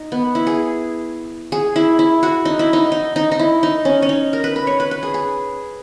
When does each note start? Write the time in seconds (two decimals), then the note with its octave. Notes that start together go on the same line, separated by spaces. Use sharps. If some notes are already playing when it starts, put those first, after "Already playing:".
Already playing: D#4
0.12 B3
0.35 E4
0.47 G#4
1.52 G#4
1.76 E4
1.99 E4
2.23 F#4
2.45 D#4
2.59 E4
2.73 D#4
2.92 D#4
3.16 D#4
3.32 D#4
3.39 E4
3.63 D#4
3.85 C#4
4.02 C#4
4.09 D#4
4.33 A#4
4.44 B4
4.56 B4
4.67 C#5
4.80 B4
4.91 B4
5.03 G#4
5.14 G#4